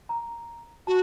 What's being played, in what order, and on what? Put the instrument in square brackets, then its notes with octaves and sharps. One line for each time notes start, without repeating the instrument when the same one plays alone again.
[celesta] A#5
[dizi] F#4 [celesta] A5